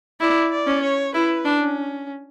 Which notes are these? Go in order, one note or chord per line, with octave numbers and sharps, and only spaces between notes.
E4 D5
D5
C#4
C#5
E4 B4
D4
C#4